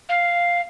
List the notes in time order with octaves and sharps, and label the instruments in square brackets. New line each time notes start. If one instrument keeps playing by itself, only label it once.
[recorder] F5